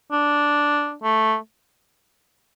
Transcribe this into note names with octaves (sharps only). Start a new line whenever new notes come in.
D4
A3